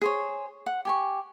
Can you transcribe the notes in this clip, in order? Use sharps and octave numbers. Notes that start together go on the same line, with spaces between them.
G#4 C5 C#5
F#5
G4 G#5 C#6